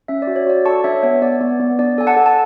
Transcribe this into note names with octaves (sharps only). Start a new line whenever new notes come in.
C#4 E5
D5
F#4
C#5
F#4 D5
A4 A5 C#6
D4 C#5 E5
B3 C#5
B3 D5
B3
B3
D4 D5
A4 G#5
F#5 A5
A4
A5